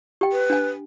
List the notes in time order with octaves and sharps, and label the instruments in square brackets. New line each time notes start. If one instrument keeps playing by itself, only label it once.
[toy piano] G4 G5
[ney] B4
[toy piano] D4 G#5